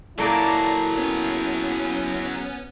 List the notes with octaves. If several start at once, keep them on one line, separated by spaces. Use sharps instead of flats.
A#2 F#3 A#3 E4 G#4 A4 D5 A#5
B3 C#4